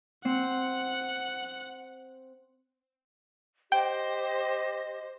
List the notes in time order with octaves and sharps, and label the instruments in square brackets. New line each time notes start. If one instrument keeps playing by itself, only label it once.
[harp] C4 [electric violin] F#5
[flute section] G4 D#5 [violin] C5 [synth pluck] G5